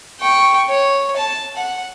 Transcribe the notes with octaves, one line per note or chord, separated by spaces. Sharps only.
G5 C#6
C#5
A5
F#5